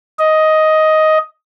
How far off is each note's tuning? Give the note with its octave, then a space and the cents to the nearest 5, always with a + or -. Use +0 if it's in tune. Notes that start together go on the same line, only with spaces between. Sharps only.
D#5 +10